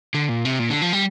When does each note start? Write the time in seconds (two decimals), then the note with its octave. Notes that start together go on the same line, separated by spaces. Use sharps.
0.14 D3
0.29 A#2
0.45 C3
0.59 A#2
0.70 D3
0.82 F3
0.93 G3